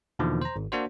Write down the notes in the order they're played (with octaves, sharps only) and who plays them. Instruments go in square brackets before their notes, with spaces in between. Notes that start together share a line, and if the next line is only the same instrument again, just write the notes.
[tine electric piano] E2 B2 D3 D#3 F3 A#3
C5 A#5
G#1
A#3 D4 F#4 C5